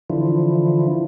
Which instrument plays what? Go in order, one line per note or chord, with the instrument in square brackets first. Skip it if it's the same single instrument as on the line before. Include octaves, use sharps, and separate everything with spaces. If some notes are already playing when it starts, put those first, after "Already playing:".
[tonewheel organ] D3 E3 F3